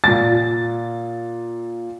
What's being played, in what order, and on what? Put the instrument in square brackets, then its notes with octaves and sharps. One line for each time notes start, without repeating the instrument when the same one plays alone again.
[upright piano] A#2 A6